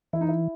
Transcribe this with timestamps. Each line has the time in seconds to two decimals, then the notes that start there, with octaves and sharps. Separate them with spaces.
0.13 E3 E4
0.21 D#4
0.29 E4